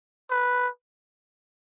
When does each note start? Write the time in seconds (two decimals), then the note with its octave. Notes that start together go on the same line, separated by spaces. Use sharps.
0.31 B4